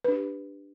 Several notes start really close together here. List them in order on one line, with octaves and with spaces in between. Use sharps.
B4 D4 G4